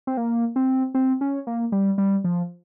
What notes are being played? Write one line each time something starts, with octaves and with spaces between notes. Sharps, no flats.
C4
A#3
C4
C4
C#4
A#3
G3
G3
F3